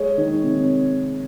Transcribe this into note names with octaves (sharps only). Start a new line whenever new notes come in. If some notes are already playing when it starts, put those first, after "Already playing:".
Already playing: G#3 C#5
D#3
C3